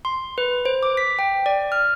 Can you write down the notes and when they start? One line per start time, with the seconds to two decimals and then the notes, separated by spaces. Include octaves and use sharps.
0.05 C6
0.38 B4
0.65 C5
0.83 D6
0.97 B6
1.19 G5
1.46 D5
1.72 F6